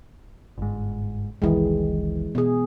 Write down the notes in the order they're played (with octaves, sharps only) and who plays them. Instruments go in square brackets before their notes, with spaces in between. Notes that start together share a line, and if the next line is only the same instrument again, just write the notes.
[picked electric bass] G1 G#2
[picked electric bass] F1 C2 D#3 [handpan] E3 G#3
[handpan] B2 G#4